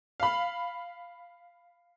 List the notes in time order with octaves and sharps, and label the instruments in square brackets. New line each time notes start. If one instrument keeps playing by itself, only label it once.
[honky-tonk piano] F5 B5